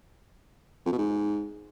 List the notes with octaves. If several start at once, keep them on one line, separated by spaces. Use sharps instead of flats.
F2
B2
G#2